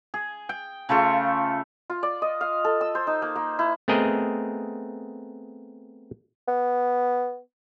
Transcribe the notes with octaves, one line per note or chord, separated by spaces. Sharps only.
G#4
G5
C#3 A3 F4 C#6
F4
D5
D#5
F5
A4
E6
C5
D#4
A#3
A#3
E4
A3 B3 C4 G#4 A#4 D#5
B3